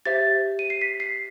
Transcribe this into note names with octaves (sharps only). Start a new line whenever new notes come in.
G4 C5 E5 A6
D#7
C7
B6
C7